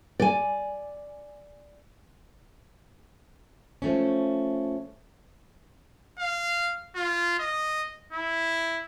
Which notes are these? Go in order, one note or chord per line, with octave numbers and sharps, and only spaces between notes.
D5 G#5
F3 A3 C#4
F5
F4
D#5
E4